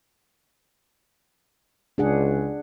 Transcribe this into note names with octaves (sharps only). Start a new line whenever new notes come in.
C#2 D4 G#4 F#5